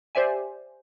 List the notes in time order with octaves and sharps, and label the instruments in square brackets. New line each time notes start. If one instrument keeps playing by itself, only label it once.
[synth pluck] G4 C5 D5 E5 G#5